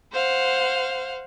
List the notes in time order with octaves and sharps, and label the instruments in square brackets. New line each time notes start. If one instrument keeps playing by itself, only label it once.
[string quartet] C5 F5 F#5